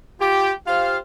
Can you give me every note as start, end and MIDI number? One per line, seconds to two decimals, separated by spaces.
0.21 0.52 65
0.21 0.52 67
0.67 0.97 65
0.67 0.97 67
0.67 0.97 72
0.67 0.97 77